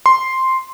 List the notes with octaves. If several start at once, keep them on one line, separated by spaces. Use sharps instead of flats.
C6